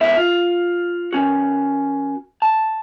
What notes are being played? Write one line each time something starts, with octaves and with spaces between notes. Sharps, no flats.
C#2 B2 E4 E5
F4
D#3 C#4 F#4
A5